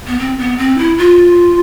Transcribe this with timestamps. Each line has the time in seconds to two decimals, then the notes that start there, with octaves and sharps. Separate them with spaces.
0.07 B3
0.19 C4
0.39 B3
0.58 C4
0.78 E4
0.98 F4